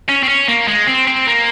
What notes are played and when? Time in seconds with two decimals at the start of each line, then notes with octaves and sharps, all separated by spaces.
0.09 C#4
0.23 C4
0.29 C#4
0.48 A#3
0.68 G#3
0.88 C4
1.07 C4
1.27 A#3